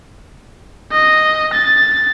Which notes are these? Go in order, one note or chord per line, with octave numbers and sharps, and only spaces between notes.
D#5
A6